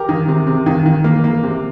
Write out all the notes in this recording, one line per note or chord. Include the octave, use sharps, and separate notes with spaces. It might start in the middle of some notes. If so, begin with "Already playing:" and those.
Already playing: G4 A#4
D#3
C3
C3
D#3
D#3
A#3
A#3
C3